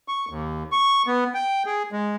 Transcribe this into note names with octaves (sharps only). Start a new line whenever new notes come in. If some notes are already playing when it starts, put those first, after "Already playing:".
C#6
D#2
C#6
B3
G5
G#4
G#3